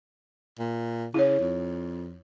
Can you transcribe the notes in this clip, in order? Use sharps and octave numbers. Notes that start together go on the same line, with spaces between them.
A#2
C#3 E4 C#5
F2